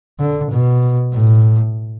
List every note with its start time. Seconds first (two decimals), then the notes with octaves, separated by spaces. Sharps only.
0.20 D3
0.52 B2
1.14 A2